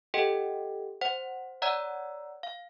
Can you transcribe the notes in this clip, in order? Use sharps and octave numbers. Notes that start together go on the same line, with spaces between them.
G4 A4 D#5 F#5 G5
C5 F#5
C#5 D5 F#5 A#5 E6 G#6
F5